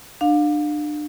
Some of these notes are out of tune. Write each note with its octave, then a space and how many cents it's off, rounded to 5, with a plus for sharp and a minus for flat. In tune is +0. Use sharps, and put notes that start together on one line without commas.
D4 +30 F5 +30